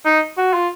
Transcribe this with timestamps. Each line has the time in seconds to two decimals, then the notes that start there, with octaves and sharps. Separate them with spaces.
0.05 D#4
0.38 F#4
0.54 F4